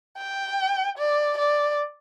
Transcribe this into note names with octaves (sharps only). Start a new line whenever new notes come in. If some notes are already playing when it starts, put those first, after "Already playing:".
G5
D5
D5